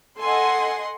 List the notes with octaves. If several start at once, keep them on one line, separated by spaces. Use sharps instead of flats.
A4 D#5 F#5 G#5 C6